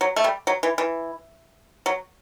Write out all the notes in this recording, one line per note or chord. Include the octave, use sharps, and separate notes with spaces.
F#3
A3
G3
F#3
E3
E3
F#3